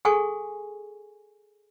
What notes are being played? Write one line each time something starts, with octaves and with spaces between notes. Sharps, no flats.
G#4 A4 F#5 G#5 C#6